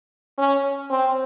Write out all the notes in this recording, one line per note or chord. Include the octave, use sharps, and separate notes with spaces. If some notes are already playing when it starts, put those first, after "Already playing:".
C#4
C4